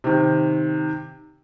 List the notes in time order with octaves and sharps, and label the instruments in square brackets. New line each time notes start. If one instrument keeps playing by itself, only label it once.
[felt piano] C3 D#3